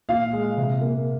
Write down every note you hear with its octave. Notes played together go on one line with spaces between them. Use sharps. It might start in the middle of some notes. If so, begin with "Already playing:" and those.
A#2 F5
G#3
C3
A#3